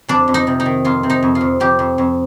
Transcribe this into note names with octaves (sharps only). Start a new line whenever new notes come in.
F2 D4
F2
D#4
C3
D#4
D#3
F2 F4
C3
D#4
F2
F4
F2
F2 G4
F2
F2